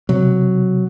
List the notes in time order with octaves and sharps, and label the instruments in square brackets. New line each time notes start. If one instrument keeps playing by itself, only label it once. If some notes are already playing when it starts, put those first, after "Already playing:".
[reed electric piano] C3 [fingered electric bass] F#3